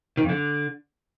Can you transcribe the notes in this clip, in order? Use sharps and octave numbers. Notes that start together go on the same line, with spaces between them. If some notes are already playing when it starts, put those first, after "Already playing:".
D#3
F2
D3